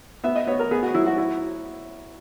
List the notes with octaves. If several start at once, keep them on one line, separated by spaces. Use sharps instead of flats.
B3 E5
D#5
B3 C#5
A#4
B3 G#4
F#4
F#3 E4
F#4
E4 F#4